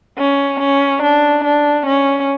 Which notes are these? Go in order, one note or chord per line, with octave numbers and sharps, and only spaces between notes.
C#4
C#4
D4
D4
C#4